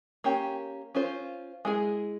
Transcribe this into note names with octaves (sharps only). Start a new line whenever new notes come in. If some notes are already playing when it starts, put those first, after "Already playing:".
A#3 C#4 G4
C#4 F4 C5
G#3 E4 G#4